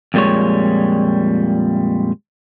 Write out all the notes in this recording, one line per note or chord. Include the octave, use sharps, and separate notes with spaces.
F2 A#2 G3 G#3 C#5